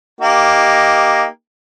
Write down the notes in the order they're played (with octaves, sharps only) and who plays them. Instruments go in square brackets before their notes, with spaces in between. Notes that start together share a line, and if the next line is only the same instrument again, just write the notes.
[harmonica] A#3 D#4 G4